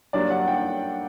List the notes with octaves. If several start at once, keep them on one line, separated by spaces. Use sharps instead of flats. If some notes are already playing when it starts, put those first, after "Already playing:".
G2 F#3 A#3 D4 D5
F#5
G5